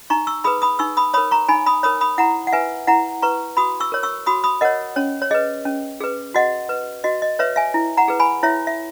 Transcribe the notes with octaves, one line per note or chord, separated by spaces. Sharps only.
D#4 A#5 C#6
C#6 E6
G#4 B4 B5 D#6
B5 D#6
D#4 C#6 E6
B5 D#6
A#4 C#5 B5 D#6
A#5 C#6
D#4 G#5 B5
B5 D#6
A#4 C#5 B5 D#6
B5 D#6
E4 F#5 A#5
F#5
B4 E5 G#5
E4 F#5 A#5
B4 A#5 C#6
F#4 B5 D#6
C#6 E6
A#4 C#5
C#6 E6
F#4 B5 D#6
B5 D#6
A#4 C#5 D#5 F#5
C#4 C#5
C#5
G#4 B4 D#5
C#4
G#4 B4
F#4 D#5 F#5
B4
F#4 D#5
D#5
B4 C#5 E5
E5 G#5
E4
F#5 A#5
G#4 B4
G#5 B5
E4 C#5 E5
E5